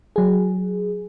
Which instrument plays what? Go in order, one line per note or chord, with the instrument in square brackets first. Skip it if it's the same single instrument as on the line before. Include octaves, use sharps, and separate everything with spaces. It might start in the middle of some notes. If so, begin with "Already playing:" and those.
[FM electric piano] F#3 G#4